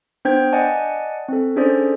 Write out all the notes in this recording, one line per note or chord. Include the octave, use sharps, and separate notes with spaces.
B3 D4 C5 G5 G6 G#6
D5 D#5 F#5 G#5 A5
C4 A4
C#4 D4 G#4 A4 C5 D5